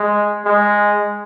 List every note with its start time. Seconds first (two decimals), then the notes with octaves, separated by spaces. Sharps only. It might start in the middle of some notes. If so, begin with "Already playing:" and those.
Already playing: G#3
0.46 G#3